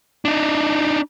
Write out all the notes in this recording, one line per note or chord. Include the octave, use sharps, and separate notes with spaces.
D4 D#4